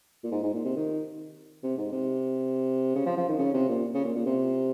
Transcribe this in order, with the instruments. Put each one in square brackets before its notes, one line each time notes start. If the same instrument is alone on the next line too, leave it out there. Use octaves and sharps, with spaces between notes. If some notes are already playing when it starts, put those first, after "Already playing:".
[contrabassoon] A#2
G#2
G#2
A#2
C3
D#3
C3
G#2
C3
C#3
F3
F3
D#3
C#3
C3
A#2
C#3
A#2
A#2
C3